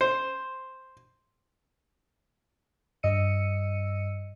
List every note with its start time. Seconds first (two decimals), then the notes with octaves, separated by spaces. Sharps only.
0.01 C5
3.03 G2 D#5 E6 C#7 D#7